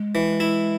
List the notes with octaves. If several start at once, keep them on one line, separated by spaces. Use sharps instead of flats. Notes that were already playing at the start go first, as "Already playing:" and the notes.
Already playing: G#3
E3
E4